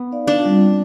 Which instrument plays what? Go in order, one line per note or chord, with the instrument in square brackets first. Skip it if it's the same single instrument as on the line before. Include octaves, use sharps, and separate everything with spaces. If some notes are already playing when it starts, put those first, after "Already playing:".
Already playing: [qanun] B3
[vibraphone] D#4 B4 D5 F5
[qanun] D4
[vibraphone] G3 C4 F4